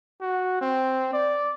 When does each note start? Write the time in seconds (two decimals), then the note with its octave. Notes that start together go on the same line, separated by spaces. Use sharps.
0.21 F#4
0.61 C4
1.13 D5